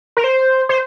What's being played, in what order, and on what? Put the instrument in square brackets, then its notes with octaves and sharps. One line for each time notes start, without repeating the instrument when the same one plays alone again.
[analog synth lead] A#4
C5
C5